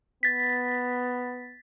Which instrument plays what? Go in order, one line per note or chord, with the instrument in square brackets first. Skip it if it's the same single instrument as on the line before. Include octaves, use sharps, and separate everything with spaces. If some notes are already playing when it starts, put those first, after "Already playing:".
[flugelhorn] B3 [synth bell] A6 B6